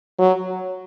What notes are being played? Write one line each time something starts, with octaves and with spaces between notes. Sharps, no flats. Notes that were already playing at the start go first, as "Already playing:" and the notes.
F#3